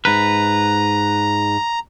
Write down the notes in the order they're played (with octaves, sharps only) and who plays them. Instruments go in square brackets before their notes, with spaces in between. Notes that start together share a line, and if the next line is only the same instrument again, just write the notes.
[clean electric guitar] G#2 B4 [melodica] A#5